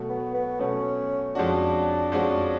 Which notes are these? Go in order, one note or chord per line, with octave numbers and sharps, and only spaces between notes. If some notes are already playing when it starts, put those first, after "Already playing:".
Already playing: B2 F#3 A3
B3
B3
B2 F#3 A3 C#4
F2 F3 G#3 C#4 D4 F#4
F2 F3 G#3 C#4 F#4